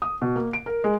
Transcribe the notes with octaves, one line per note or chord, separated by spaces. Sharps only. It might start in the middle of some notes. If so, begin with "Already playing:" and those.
D#6
B2
A#3
D7
A#4
G#3